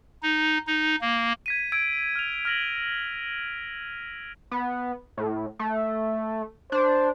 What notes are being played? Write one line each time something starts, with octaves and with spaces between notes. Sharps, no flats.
D#4
D#4
A#3
G#6 B6 D#7
E6 G#6 D7
F6 F7
F6 A#6 F#7
B3
A2
A3
D4 C5